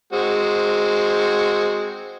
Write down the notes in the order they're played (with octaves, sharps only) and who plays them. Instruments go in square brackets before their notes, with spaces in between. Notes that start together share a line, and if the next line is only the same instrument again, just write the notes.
[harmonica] G#3 C4 F#4